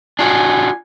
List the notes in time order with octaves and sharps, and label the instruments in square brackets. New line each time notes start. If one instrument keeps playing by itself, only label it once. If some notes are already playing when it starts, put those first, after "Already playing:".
[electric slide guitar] D4 F4 F#4 [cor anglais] G#5